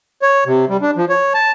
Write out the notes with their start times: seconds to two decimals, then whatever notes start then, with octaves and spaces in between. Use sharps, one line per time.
0.22 C#5
0.46 C3
0.69 G3
0.82 D4
0.97 F3
1.09 C#5
1.34 A5